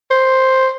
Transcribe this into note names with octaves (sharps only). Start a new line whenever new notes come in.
C5